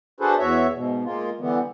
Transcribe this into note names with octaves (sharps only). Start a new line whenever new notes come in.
D4 F#4 G#4 A4 B4 C5
E2 F#4 C#5 E5
G#2 B2
G#3 A#3 F4
D3 E3 G3 B3